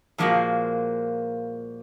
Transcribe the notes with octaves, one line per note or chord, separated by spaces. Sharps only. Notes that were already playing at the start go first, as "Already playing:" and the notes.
A#2 F3 G#3 A#3 F4 F#4